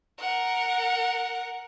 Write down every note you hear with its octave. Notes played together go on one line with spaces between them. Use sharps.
A#4 F#5